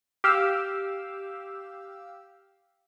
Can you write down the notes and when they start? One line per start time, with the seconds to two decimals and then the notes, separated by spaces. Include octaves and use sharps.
0.24 G4 F5 E6